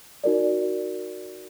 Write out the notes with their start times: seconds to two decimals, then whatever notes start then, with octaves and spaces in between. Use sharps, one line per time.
0.24 D#4 F#4 A#4 D5